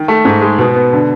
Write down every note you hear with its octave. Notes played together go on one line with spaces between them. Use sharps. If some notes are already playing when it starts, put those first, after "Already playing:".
Already playing: D#3
A3
G#2
G#3
B2
B3
D3